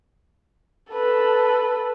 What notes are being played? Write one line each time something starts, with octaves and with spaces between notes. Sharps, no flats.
A4 B4